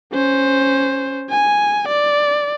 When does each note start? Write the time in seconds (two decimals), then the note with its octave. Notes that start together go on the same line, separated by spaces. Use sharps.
0.13 C#4 C5
1.30 G#5
1.88 D5